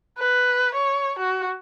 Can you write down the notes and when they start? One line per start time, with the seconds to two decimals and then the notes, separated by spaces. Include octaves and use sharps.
0.19 B4
0.75 C#5
1.19 F#4